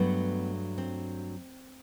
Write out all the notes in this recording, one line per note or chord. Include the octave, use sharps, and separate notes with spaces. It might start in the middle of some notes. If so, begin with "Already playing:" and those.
Already playing: G2 F#3 A3 B3
C4